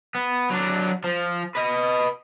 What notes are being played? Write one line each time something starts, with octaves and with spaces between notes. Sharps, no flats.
B3
F#3 D4
F3
B4 D#5